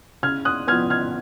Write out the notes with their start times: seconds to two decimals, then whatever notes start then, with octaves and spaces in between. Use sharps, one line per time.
0.23 C#3 F6 G#6
0.45 D#6 F#6
0.67 F3 B3 F6 G#6
0.90 F6 G#6